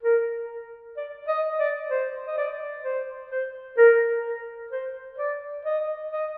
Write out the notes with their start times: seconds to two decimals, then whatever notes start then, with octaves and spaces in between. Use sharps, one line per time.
0.03 A#4
0.97 D5
1.28 D#5
1.60 D5
1.90 C5
2.27 D#5
2.38 D5
2.84 C5
3.31 C5
3.78 A#4
4.71 C5
5.18 D5
5.65 D#5
6.11 D#5